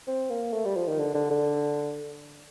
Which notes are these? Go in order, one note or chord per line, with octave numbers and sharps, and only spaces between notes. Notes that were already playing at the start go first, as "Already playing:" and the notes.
C4
A#3
A3
G3
F3
D#3
D3
D3
D3